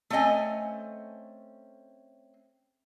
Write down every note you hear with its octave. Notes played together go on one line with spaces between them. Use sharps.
A3 C4 C#4 D#5 G#5